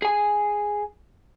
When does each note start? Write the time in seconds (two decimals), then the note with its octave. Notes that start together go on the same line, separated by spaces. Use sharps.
0.02 G#4 G#5